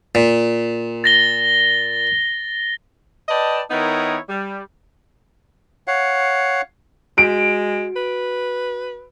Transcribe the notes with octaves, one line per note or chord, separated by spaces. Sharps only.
A#2
A6 A#6 G7
B4 D5 D#5 G5 A5
D#3 B3 D#4 E4 A#4 C#5
G3
C#5 F5 F#5
G#3 F#4 D7
B4